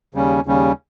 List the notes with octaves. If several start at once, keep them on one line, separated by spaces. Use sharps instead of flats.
D#2 C#3 G3 C#4
D#2 C#3 G3 C#4